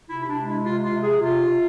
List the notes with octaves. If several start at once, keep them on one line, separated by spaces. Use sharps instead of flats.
C3 E4
E4
D4
G#3
E4
C3 F4
F4
C3
G#4
C3 F4
C3